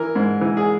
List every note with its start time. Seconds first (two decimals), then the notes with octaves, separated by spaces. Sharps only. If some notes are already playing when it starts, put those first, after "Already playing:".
Already playing: E3 A#4
0.16 G#2
0.41 E3
0.57 G#4